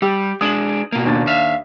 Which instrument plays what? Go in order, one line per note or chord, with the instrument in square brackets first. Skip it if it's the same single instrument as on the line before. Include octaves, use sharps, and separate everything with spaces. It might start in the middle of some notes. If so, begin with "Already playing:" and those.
[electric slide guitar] G3 [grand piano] G4 E6
[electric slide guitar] G#3 D4 [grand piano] D#6 F#7
[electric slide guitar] B2 A#3
[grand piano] D#2 D4 A6
[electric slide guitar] E5 F5